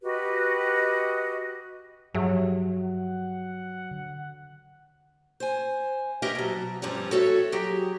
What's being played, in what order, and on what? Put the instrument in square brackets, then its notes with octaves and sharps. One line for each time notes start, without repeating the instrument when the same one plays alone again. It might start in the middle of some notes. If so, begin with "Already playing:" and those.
[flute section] F#4 G4 B4 D#5
[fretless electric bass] G2 F3 [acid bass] F#3 [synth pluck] G4 G#4 E5
[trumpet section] F#5
[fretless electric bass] D3
[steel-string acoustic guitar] C5 G#5
G4 A#4 B4 C#5 D#5 E5
B2 F#3
G2 F3 G3 C#4
F#4 A4 C#5 E5
F#3 G4 G#4